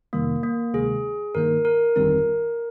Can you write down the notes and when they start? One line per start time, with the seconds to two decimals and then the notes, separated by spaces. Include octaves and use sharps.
0.13 F2 C3 D#3 G3 A#3
0.43 A#3
0.74 D2 C3 D#3 G#3 G#4
1.35 G2 D#3 A#3 A#4
1.65 A#4
1.96 G1 F2 D#3 G3 C4 A#4